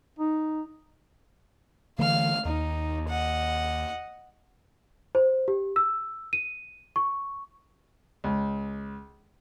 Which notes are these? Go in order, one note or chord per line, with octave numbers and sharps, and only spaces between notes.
D#4
D3 E3 A3 F5 F6
D#2 D#4
D#5 F#5
C5
G4
E6
D#7
C#6
C#2